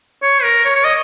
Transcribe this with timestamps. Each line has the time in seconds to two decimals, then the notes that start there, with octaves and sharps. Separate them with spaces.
0.22 C#5
0.43 A#4
0.65 C#5
0.75 C#5
0.85 D#5